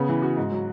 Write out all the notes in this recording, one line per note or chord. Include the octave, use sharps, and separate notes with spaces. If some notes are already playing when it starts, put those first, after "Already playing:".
Already playing: C#3 B3
E3
F#4
G#2
F#3